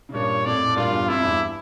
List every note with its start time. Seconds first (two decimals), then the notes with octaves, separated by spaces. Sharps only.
0.09 C#3
0.13 G2 A#2 C#5
0.45 F2 A2 D5
0.66 A2
0.76 G2 A#2 F4
0.92 E2 G2
1.08 F2 E4
1.23 E2 G2